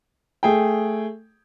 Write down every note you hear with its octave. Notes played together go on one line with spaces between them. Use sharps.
A3 G#4 G5